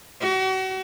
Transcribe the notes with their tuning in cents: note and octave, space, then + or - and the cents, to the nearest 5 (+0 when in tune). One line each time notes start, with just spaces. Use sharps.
F#4 +35